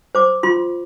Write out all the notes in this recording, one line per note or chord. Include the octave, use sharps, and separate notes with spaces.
C5 D6
F4 C6